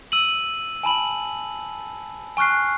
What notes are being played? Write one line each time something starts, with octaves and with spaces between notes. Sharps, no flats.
E6 D#7 F#7
G#5 A5 B5 F#7
G#5 C#6 F6 F#6 C7